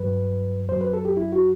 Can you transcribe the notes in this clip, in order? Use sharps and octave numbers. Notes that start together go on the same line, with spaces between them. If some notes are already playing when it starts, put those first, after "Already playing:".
Already playing: G2 F#3 B4
F#2 F#3 C5
B4
A4
G4
E4
F#4